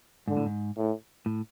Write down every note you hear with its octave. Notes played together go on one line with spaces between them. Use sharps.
G#2 D3
A2
G#2
A2
A2